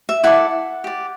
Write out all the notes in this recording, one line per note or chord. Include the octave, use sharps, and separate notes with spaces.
E5
E4 A4 D5 F#5
G4 D5